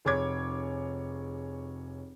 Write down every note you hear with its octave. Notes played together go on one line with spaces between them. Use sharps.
F1 G#4 C#5 D6 G#6